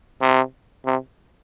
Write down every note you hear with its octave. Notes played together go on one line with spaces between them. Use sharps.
C3
C3